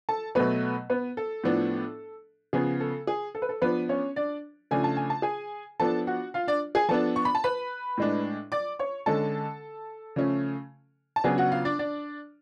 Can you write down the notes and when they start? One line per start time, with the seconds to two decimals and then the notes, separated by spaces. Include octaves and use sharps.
0.09 A4 A5
0.35 B2 F#3 A3 B3 B4
0.90 B3 B4
1.17 A4
1.44 A2 F3 B3 D4
2.53 C#3 F3 B3 G#4
2.80 A4
3.07 G#4
3.35 A4
3.42 B4
3.49 A4
3.62 F3 B3 D4 B4
3.89 C#4 C#5
4.16 D4 D5
4.71 C#3 F3 A3 D4 G#5
4.84 A5
4.97 G#5
5.10 A5
5.22 G#4 G#5
5.80 F3 B3 D4 A4 A5
6.07 F#4 F#5
6.34 F4 F5
6.47 D4 D5
6.75 G#4 G#5
6.88 F3 B3 D4 A4 A5
7.16 C#6
7.25 B5
7.35 A5
7.44 B4 B5
7.98 A2 G#3 D4
8.52 D5 D6
8.79 C#5 C#6
9.06 D3 G#3 C#4 A4 A5
10.16 C#3 F3 A3 C#4
11.16 A5
11.24 C#3 F#3 B3 D4 G#4 G#5
11.38 F#4 F#5
11.52 F4 F5
11.65 D4 D5
11.79 D4 D5